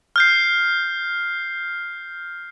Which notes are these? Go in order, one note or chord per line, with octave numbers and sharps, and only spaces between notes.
F6 G6 C7